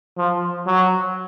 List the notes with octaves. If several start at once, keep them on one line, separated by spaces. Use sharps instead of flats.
F3
F#3